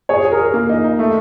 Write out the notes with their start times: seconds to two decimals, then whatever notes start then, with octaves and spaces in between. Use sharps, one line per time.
0.09 G#4 C#5
0.25 G#4
0.32 A#4
0.39 G#4
0.54 A#3
0.69 D#4
0.84 D#4
0.99 A3